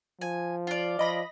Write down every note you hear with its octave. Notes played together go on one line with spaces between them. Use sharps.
F3 G#5
F4 D5
F3 D#5 B5 A#6